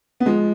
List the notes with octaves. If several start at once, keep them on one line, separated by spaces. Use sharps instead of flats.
B3
F3 G#3